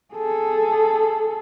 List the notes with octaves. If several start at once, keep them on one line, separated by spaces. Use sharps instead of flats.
G#4 A4